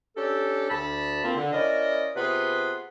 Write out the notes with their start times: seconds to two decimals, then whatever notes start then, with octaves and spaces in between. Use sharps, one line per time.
0.16 C#4 D4 G4 A4
0.70 D2 A5 B5
1.24 A#3 C4 F4
1.36 D3
1.52 C#4 E4 A#4 D5 D#5
2.16 C3 B3 F4 G#4 B4